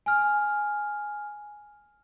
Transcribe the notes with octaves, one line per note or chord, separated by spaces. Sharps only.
G#5 F6